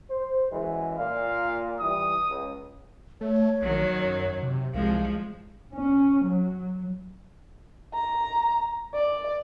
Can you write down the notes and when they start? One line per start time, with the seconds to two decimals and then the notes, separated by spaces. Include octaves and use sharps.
0.10 C5
0.51 F#2 E3 G#3
0.98 A#2 F5
1.80 E3 G3 D#6
2.29 C#2
3.21 A3 C#5
3.62 A#1 D#3 F#3
3.96 F#2
4.43 C3
4.74 C2 F3 G#3 F5
5.74 C#4
6.24 F#3
7.94 A#5
8.95 D5